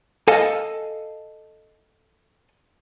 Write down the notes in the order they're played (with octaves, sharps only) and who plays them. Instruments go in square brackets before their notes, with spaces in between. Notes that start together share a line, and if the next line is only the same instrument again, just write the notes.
[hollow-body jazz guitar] A4 D#5 F5 G#5 A5